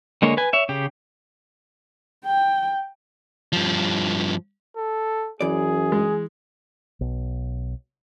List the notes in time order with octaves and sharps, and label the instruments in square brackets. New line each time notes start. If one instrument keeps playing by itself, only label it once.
[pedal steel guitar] D3 G#3 A#3 C#5
B4 G#5
C#5 E5
C#3 G4
[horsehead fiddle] G5
[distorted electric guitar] G2 F3
[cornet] A4
[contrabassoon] F#2 [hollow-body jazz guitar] E3 D5 [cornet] G#4
[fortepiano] G#3
[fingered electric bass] B1